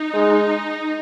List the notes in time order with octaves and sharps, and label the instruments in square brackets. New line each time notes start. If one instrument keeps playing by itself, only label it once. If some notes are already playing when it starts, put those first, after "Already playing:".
Already playing: [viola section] D#4
[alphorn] G#3